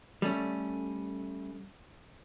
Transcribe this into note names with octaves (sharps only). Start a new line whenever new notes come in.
G3 A3 C#4